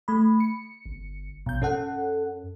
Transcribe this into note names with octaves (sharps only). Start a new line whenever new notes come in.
A3 B5
C#7
G1
A#1 B2 G6
F#2 C#4 A4 F#5